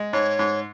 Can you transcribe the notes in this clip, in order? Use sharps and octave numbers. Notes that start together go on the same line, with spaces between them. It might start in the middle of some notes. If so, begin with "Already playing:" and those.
Already playing: G#3
G#2 C#5
G#2